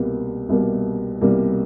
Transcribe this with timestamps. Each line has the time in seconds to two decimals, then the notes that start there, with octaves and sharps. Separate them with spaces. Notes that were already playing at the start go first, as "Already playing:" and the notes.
Already playing: C2 B2 G3 A#3
0.49 C2 B2 G3 A#3
1.21 C2 B2 G3 A#3